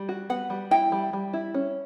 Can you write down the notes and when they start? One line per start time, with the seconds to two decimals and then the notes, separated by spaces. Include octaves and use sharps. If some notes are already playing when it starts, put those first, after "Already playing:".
Already playing: G3
0.09 F#4
0.30 B3 F#5
0.50 G3
0.71 E4 G5
0.92 G3
1.13 G3
1.33 E4
1.54 C#4